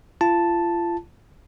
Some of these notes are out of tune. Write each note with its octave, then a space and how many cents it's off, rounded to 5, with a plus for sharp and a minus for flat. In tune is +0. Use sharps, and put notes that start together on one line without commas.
F4 -35 A5 +0